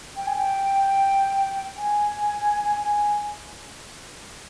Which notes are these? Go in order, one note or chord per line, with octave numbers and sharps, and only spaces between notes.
G5
G#5
G5
G#5